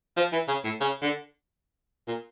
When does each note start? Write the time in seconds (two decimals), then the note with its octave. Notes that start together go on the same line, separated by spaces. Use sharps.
0.17 F3
0.33 E3
0.48 C#3
0.64 A2
0.81 C#3
1.02 D3
2.08 A#2